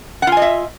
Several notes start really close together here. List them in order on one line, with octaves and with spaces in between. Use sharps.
F#5 F4 G#5 D#5 E5